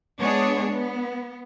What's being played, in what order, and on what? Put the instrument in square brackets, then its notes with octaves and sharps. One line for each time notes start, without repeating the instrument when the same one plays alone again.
[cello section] G#3 B3 D4 G#4 C#5
B3